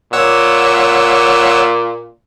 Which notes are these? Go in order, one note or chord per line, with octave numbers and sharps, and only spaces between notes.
A#2 C#5 F#5 E6